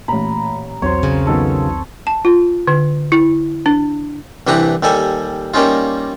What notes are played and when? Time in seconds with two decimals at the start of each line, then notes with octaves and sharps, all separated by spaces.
0.08 A1 A#2 A#5 B5
0.82 B1 E2 F#3 C4 C5 C#5
1.03 C#3 A#3
1.27 D#3 F#3 B3 A4
2.07 A5
2.25 F4
2.67 D3
3.12 E4
3.66 D4
4.47 C2 E3 D4 G4 B4 A#5
4.83 D#2 G3 A4 G#5
5.54 G3 A#3 C#4 D#4 F4